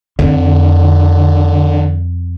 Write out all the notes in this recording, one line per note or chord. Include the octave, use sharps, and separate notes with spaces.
F2 D3